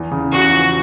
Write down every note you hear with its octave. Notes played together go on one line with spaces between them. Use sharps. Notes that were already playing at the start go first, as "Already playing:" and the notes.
Already playing: E2
C#3
E2 F#4
F3